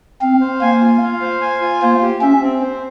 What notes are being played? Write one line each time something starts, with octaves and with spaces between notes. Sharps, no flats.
C4 F5
C5
A#3 G#5
F4
F5
C5
G#5
F4
A#3 C5
G4
C#4 E5
C4
C5